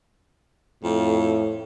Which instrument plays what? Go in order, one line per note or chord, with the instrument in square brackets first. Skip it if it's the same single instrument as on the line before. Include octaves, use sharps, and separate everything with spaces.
[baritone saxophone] F2 [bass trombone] A2